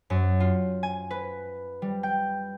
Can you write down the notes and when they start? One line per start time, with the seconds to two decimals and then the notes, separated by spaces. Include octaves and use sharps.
0.10 F#2
0.40 F4
0.83 G#5
1.10 B4
1.82 G3
2.03 G5